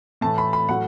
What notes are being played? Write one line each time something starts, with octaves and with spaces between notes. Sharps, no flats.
A2 E3 A3 A5
B5
B5
A2 F#3 A3 F#5